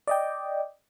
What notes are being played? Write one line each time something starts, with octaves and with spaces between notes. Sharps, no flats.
D5 D#5 G5